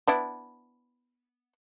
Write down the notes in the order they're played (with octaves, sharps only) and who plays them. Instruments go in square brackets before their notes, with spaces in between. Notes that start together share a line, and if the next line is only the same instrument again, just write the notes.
[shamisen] B3 D4 E4